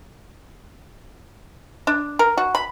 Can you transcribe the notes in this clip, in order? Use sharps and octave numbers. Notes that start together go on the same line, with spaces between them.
D4
A#4
F#4
B5